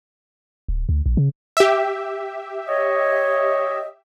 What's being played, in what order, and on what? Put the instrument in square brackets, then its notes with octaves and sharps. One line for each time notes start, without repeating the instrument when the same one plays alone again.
[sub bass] D1
D2
A#1
C#3
[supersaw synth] G4 E5
[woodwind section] C#5 D#5